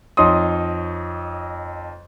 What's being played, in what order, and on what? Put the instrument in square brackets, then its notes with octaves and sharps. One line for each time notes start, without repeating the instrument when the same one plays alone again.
[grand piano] F2 D#4 C#5 C6 D#6